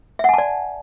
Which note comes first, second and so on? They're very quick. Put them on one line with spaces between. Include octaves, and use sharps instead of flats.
E5 F#5 G#5 A5 D5